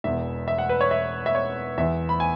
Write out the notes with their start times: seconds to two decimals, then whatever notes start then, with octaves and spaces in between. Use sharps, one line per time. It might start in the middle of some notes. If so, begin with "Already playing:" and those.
0.04 E1 E2 E3 E5
0.48 E5
0.58 F#5
0.69 B4
0.81 C#5
0.91 E5
1.26 E5
1.35 C#5
1.78 E2 E3 E5
2.09 B5
2.20 G#5